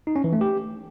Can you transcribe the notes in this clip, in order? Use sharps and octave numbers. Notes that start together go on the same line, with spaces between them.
D#4
C#4
E3
A3
G4